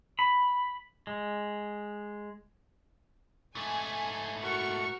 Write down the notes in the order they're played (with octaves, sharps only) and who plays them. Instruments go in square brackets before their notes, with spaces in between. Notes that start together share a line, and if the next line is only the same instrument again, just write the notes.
[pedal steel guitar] B5
G#3
[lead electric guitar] G#2 A3 [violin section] G#5
[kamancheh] F#4 A#4 [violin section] C#6